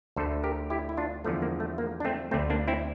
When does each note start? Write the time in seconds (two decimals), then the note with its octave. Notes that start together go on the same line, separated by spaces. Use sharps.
0.16 D2 D3 A3 A4 C5
0.44 G4 A#4
0.70 E4 G4
0.89 E4
0.97 D4 F4
1.25 E2 D3 F3 A3
1.42 A#3
1.60 A3
1.78 A#3
2.00 D4
2.05 A3 C4
2.31 D2 D3 A3 C4
2.50 A#3 D4
2.68 C4 E4